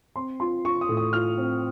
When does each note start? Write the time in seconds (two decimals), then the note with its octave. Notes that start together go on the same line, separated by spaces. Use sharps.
0.16 C4 C6
0.40 F4 C6
0.65 F4 C#6
0.81 D#6
0.89 A2
0.97 D#6
1.13 F4 F6
1.38 C4